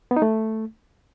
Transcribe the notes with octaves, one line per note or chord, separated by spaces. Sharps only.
B3
D#4
A3